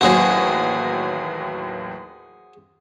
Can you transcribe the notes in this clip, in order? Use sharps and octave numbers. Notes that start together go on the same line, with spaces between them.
A1 D#2 F#3 F#4 G#4 C5